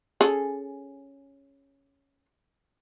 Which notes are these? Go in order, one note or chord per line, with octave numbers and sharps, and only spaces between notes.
C#4 G#4 A4